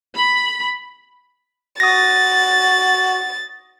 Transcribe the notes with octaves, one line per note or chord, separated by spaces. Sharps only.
B5
F#4 D#6 A6 A#6